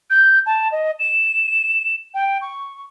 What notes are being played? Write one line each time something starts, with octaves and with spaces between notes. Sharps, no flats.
G6
A5
D#5
E7
G5
C#6